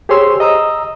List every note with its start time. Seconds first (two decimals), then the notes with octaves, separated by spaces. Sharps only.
0.09 G4 G#4 C5 C#5 C6 E6
0.40 D#5 A#5 D#6 E6